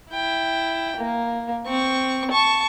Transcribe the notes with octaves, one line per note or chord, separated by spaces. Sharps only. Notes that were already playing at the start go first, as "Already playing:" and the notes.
E4 G5
A#3
C4 C#6
A5 C#6